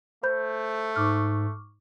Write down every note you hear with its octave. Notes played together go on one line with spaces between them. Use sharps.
A3 C5 B5 G6
G#2 C#6 D6 F6